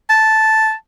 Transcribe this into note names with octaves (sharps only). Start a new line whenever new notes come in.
A5